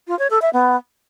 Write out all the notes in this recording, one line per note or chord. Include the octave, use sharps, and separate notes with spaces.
F4
C#5
A4
E5
B3